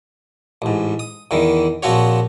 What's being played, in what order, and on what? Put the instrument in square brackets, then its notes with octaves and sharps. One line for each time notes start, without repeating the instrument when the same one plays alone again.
[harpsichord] A1 G#2
D#6
E2 D#3 E3
A#1 F3 C4 F#4 C#5